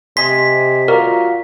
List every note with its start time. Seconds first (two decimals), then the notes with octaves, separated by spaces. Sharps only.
0.17 C3 D#5 G#5 C6 B6
0.88 F4 F#4 A#4 D5 A#5